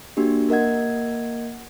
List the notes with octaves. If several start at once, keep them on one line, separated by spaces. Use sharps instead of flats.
A#3 D4 F#4 G4
A#3 A#4 D#5 F#5 G#6